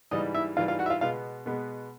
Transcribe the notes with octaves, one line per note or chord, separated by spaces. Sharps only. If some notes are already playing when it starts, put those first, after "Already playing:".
G#2 E3 G3 D#4 D#5
E4 E5
G#2 E3 G3 F4 F5
F4 F5
F#4 F#5
E5
F4 F5
B2 G#3 B3 F4 F5
B2 G#3 B3